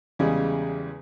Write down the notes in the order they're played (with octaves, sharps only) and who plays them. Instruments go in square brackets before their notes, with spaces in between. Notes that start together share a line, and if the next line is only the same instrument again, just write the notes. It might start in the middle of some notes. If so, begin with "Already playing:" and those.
[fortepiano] E2 C#3 G3 G#3